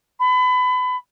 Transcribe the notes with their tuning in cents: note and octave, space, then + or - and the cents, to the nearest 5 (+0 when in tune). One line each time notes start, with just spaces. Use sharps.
B5 +30